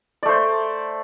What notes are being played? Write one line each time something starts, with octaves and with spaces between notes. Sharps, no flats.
A3 C5 D5